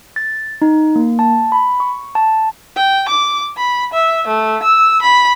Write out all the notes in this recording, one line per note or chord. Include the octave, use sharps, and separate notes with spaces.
A6
D#4
A#3
A5
B5
C#6
A5
G5
D6
B5
E5
A3
E6
B5